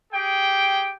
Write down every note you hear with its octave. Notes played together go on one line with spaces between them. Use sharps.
G4 G#4 G5